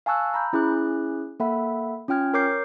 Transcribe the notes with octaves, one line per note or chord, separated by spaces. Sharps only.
F5 G#5 A5 C#6 E6 F#6
A#5 B5 G6
C#4 E4 G#4 D6 F#6
A#3 A4 E5 F#5 B5
C#4 F4 G5 F6 G#6
A#4 C#5 D6 G6 C7